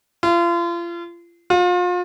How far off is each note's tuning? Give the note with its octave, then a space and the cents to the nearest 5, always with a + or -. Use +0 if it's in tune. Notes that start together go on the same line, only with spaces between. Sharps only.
F4 -35
F4 +35